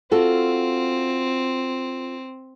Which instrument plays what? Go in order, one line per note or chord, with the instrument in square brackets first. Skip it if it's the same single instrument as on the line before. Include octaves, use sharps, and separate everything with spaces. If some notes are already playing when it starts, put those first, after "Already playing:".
[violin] C4 [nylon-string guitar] F4 F#4 A4